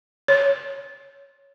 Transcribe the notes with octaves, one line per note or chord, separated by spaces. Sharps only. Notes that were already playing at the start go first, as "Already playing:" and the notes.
C#5